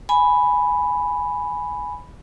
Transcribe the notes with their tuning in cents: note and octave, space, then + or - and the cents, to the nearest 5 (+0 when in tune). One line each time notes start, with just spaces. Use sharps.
G#5 +0 B5 +0